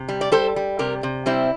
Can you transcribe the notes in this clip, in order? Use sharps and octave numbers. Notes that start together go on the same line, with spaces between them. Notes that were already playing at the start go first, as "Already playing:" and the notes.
Already playing: C3
G3
D5
G3 A4 C5
G3
C3 G4 A#4
C3
G3 C4 E4